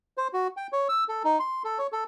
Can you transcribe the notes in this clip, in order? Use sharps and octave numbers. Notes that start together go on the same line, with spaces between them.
C5
F#4
G5
C#5
E6
A4
D#4
C6
A4
C#5
A4